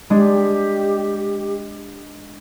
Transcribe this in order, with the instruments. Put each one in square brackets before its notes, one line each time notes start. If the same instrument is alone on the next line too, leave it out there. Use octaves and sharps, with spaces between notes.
[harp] G#3 D4 [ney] G4